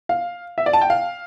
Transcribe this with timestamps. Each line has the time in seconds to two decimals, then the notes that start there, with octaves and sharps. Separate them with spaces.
0.09 F5
0.58 E5
0.66 D5
0.73 A5
0.81 G5
0.90 F5